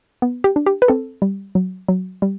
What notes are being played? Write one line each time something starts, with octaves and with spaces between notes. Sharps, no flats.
B3
G4
D4
G4
B4
C4 A4
G3
F#3
F#3
G3